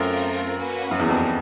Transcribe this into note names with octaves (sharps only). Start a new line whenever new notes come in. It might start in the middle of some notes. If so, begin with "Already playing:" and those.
Already playing: F#2 A3 C4 F4 A#4
A#3 C#4 F#4 B4
F#2
E2
F2